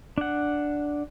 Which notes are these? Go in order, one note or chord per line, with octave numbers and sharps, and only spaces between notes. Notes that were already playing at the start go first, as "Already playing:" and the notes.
D4 F#5